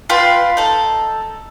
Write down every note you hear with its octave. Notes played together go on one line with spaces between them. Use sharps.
F4 B4 G5 C6
D#4 A4